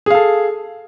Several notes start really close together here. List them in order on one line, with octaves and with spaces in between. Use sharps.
G#4 F5 A4